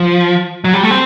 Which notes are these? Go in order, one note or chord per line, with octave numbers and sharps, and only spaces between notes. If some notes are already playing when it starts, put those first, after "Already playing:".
Already playing: F3
F#3
G3
A3
C4